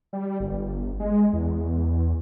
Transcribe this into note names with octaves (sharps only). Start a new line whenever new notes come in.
G3
G1
G#3
E2